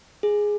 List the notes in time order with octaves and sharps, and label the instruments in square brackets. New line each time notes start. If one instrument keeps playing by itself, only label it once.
[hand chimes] G#4